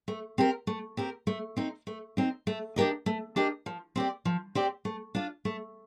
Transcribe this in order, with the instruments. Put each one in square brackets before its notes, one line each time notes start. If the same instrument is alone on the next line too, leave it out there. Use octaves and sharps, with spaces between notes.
[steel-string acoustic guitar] A3
C4 G4 A#4
A3
C4 G4 A#4
A3
C4 D#4
A3
C4 D#4
A3
D4 G4 A#4 D#5
A3
D4 G4 A#4 D#5
F3
C4 G4 D5
F3
C4 G4 D5
A3
D4 F4
A3